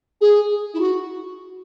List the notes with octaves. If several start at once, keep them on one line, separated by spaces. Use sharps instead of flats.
G#4
E4
F#4